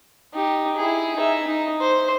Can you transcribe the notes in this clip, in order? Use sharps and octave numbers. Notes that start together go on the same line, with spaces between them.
D#4 G4
E4 G#4
D#4 E5
D#4
C5